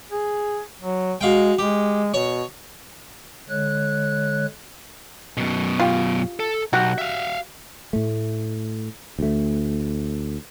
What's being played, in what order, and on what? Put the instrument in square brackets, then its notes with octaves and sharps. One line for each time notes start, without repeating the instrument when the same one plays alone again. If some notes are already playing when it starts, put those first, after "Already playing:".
[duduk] G#4
F#3
[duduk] G#3 [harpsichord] F#4 F5 G5
[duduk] G#3 [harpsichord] G4
[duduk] B2 [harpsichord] C#5
[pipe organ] D3 G#3 C#5 F#6
[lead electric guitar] F#2 B2
[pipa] F4 G4
[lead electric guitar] A4
[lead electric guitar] B1 [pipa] F#4 G4 F#5
[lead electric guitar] E5 F5
[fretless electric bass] A2 A3
D2 A3